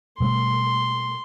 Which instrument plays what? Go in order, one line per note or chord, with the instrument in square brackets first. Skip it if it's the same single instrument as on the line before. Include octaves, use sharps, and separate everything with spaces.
[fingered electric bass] B2 G3 A3 [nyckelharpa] C6